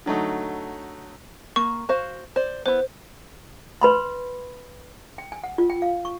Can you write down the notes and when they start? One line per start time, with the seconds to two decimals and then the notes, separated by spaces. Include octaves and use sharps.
0.06 D3 F#3 A3 D#4
1.56 A#3 C#6
1.89 F#4 C5 F5
2.36 C5 D5
2.66 B3 E4 C5
3.81 B4 B5 C6
5.18 G5
5.32 G#5
5.44 F#5
5.58 F4
5.70 G5
5.82 F5
6.05 C#6